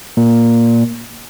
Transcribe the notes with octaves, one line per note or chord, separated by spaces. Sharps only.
A#2